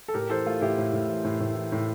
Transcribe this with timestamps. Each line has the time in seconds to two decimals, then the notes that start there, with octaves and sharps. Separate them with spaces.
0.08 A4
0.14 A2 G4 A#4
0.30 E3 A4 C5
0.46 A3 F4
0.61 A2 E4 G4
0.78 A2
0.93 A2
1.08 E3
1.24 A2
1.40 A2
1.56 E3
1.72 A2